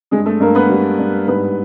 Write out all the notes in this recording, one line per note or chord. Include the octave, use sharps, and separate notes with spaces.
G2 G#3 G#4
A3 A4
G2 A#3 A#4
B3 B4
G3
G2
G#2 B3 B4